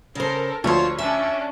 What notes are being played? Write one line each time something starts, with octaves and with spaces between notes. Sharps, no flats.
C#3 A4 A#4 C5
D2 F3 F4 C5 C#5 C6
C#4 D4 E5